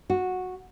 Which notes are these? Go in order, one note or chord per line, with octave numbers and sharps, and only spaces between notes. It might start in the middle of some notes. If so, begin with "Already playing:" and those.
F#4